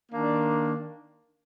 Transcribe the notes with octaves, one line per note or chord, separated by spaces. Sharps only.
D#3 A#3 D4